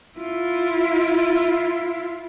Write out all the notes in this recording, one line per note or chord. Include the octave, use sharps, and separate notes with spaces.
E4 F4